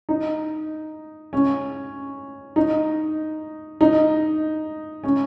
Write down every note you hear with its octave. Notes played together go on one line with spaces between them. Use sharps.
D#4
C#4
D#4
D#4
C#4